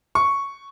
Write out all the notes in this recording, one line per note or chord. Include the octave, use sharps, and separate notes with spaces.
C#6